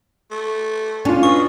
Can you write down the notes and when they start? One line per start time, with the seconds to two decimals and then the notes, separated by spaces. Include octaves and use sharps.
0.31 A3
1.05 C#4 D4 F4
1.23 B2 C#6